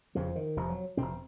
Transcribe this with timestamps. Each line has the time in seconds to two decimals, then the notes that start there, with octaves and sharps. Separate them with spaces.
0.15 F1 F2 C#3 F3
0.36 D#3
0.57 F1 F2 C3 F3
0.70 F#3
0.97 F1 F2 C3 C4